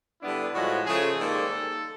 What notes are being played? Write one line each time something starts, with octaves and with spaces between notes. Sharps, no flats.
D3 G3 B3 D4 E4
A2 F3 G#3 F#4
C#3 F3 A3 G#4
G#2 D#3 G3 A#3 A4